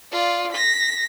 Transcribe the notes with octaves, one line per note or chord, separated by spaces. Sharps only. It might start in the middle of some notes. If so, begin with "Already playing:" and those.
F4 D5
A#6 B6